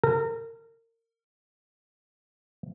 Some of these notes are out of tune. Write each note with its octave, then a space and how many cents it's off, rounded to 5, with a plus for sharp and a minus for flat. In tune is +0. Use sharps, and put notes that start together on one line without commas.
A#4 -30